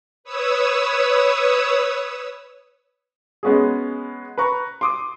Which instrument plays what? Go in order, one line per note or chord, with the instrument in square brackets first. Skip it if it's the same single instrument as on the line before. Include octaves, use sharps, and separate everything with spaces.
[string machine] B4 C#5 D#6 E6
[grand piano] G#3 B3 C#4 F#4 G#4
B4 A#5 C#6
C6 D6 D#6